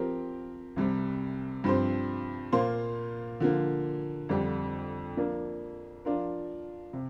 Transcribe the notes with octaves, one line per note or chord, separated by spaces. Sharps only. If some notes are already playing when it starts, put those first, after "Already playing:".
Already playing: F3 C4 G4 A#4
C2 C3 G3
G2 F3 C4 G4 C5
A#2 A#3 F4 C5
D3 F3 A#3
F2 D3 G3 D4 G4
F3 A#3 D4 A#4
F3 D4 F4 A#4
C3